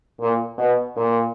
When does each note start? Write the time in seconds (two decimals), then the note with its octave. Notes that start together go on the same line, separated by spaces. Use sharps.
0.20 A#2
0.58 B2
0.96 A#2